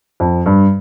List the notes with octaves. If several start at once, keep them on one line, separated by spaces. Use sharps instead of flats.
F2
G2